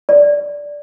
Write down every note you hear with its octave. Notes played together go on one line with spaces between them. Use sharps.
D5